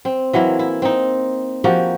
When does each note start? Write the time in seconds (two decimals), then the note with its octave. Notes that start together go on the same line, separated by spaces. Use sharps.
0.05 C4
0.33 E3 F#3 A#3 E4
0.59 E4
0.82 C4 D#4
1.64 F3 A#3 F#4 G4